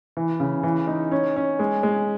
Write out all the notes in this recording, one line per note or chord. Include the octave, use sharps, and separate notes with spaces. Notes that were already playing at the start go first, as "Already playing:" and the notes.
E3
C#3
E3
D#4
C#4
C#4
G#3
G#3